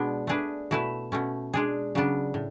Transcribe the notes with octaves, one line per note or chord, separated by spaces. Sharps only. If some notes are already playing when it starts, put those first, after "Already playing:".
Already playing: B2 G#3 B3 D4
A3 D4 G#4 B4
B2 A3 E4 B4
B2 A3 C#4
G#3 D4 G#4
C#3 F#3 B3 D4
A2